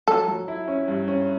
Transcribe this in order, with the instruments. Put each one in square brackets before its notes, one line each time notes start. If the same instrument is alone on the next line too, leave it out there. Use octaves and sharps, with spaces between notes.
[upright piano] F#3 [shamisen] A4
[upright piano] F#3
E4
C#4
G2
C#4